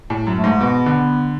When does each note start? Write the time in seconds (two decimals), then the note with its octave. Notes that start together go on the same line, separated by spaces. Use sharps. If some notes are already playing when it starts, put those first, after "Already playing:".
0.10 A2
0.27 F#2
0.36 A3
0.44 G#2
0.61 B2 B3
0.86 D3